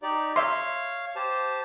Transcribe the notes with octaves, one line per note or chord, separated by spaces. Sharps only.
D#4 G4 D5
C#5 E5 F5 C6
G4 C5 A5